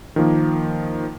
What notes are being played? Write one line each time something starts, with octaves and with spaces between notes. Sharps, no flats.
D#3 F3 A#3